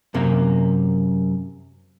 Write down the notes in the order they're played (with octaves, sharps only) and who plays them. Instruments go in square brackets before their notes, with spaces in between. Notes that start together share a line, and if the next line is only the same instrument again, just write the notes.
[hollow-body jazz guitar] F#2 C3 A#3